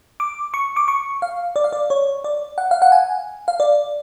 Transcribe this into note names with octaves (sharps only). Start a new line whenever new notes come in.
D6
C#6
D6
C#6
F5
D5
F5
D5
C#5
D5
F#5
F5
F#5
G#5
F5
D5